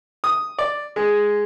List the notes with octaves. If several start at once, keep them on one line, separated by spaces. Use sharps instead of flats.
D#6
D5
G#3